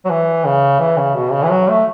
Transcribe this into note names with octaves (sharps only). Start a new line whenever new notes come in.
F#3
E3
C#3
E3
C#3
B2
C#3
E3
F#3
A3